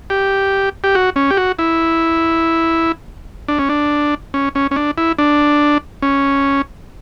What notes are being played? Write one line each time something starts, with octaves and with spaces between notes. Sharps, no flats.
G4
G4
F#4
C#4
G4
F#4
E4
D4
C#4
D4
C#4
C#4
C#4
D4
E4
D4
C#4